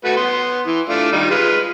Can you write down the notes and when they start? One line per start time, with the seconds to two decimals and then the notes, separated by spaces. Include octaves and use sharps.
0.05 A3 F#4 B4
0.17 B3 C6
0.66 E3
0.89 A3 D4 F4
1.12 D#3 G3 D#4
1.30 G#3 F4 B4